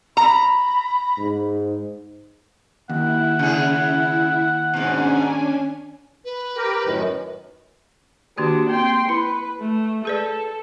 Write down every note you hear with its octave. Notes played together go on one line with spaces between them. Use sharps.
A#5 B5
G#2
D#2 E4 F#5
C#3 G#4
G#2 B2 C#4 D4 G#5
B4
G4 A#4
F#2 A2 D#3
D#3 A#3 D4 F#4 G4
A#3 C4 G5 C6
E4 B4
A3
G#4 A4 B4 D5